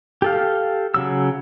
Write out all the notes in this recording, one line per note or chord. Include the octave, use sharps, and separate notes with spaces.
G4 A4 F5
C#3 F#3 E6